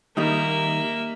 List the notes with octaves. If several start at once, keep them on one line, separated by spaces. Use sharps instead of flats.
D#3 G3 A#3 D#4 E5